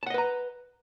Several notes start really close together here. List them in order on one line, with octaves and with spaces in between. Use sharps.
A5 F#5 D#5 B4 A#5